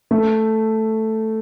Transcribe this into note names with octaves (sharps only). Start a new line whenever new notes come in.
A3